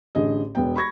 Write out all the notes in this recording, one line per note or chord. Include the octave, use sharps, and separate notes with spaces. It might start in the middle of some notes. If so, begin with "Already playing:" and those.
A1 D3 G#4 D#5
E1 B3 G5
B5 C#6 G#6 A#6